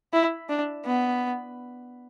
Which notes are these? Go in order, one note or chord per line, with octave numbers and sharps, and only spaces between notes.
E4
D4
B3